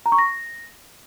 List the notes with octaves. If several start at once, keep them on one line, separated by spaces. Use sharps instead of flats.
A#5
C#6
A#6